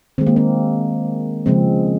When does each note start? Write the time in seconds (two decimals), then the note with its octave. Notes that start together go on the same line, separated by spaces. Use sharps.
0.18 D#3 G#3 C4
0.27 A#3
0.36 C4
1.46 C#3 F3 G#3 C4